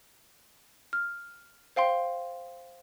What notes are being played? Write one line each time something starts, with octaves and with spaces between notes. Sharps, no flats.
F6
C5 F5 G5 C6